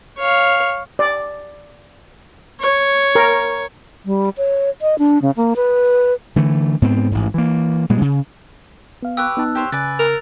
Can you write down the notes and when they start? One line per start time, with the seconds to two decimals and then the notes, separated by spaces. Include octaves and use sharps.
0.18 C#5 F5
0.99 D5
2.60 C#5
3.15 A#4
4.05 G3
4.37 C#5
4.82 D#5
4.99 D4
5.22 C#3
5.37 A#3
5.56 B4
6.36 D3 E3 A3
6.82 G#2 B3 C4
7.12 A1 G#2
7.34 E3 A#3
7.90 A#2 G3 G#3
8.01 C#3
9.03 B3 F5
9.17 G4 B4 C#6 E6 F#6
9.37 B3 D#4 A5
9.55 G4 C5 C#5
9.72 C#3 B4 D5 G#5 A6
9.99 A#4 F7